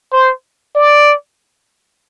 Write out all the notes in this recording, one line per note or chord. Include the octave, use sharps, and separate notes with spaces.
C5
D5